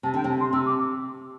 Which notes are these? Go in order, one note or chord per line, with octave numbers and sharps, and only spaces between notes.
C3 A5
D3 G5
C3 A5
C6
C3 E6
D6